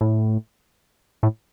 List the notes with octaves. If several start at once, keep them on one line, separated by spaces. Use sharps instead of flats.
A2
A2